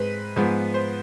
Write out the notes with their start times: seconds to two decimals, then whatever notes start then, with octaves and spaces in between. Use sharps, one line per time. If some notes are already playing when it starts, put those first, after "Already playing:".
Already playing: G#2 G#3 C4 B4
0.36 G#2 F3 B3
0.74 C5